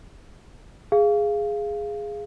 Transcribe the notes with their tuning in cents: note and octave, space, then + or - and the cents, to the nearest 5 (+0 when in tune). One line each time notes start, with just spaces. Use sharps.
G#4 +0 F5 -10